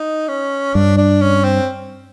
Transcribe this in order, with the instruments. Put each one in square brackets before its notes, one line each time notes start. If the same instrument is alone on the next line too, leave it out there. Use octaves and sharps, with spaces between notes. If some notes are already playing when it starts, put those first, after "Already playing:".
Already playing: [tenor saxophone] D#4
C#4
[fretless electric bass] G2 [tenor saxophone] D4
[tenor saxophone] D4
C#4
C4